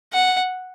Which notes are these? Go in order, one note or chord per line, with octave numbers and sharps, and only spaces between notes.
F#5